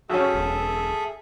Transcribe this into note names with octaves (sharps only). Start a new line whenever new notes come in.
F#2 C#4 F#4 G#4 A4 E5
E1